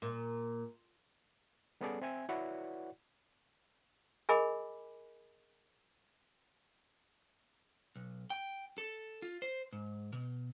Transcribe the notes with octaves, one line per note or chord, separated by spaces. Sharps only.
A#2
G3 B3 C#4 G#4 A4 D5
C4 E5 G#5 G#6
E4 F#4 B4 C#5 D5 F#5
G#4 A#4 D#5 G#5 B5 D6
B1
G5
A4
F4
C5
G#2
B2